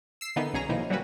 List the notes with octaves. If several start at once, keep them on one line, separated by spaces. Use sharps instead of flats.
E6 C7
D3 E3 A#3 B3 D#4
B1 C#4 G#4 A#5
B2 D#3 F3 A#3 D#4 E4
F#3 G3 A#3 C#4 F#4 B4